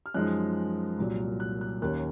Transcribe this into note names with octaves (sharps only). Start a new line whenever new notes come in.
F6
F#2 F3 G#3 D#4 F#6
C2 A#2 F#3
F#6
F#6
D#2 D#3 A#3 C#4 F#6